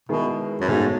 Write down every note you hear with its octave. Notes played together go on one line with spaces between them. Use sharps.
B2 D#3 G#3 B3 E4 G#4
F#2
G#2 B2 A3 D#4 F#4 C#5